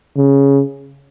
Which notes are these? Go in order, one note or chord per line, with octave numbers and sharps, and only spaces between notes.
C#3